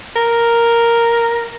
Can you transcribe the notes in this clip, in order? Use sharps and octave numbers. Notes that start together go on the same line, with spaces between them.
A#4